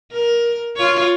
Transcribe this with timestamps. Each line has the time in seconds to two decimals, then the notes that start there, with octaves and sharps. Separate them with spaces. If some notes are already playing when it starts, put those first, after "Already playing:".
0.12 A#4
0.77 F4 C#5